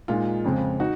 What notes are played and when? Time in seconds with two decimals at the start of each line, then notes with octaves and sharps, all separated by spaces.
0.08 A#2 G#3 D#4 F4
0.45 F2 C#3 G#3 C4
0.80 D#4 F#4